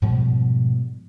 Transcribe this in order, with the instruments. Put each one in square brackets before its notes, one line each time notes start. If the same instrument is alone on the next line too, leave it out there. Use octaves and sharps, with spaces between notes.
[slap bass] G#2 B2 F3 G3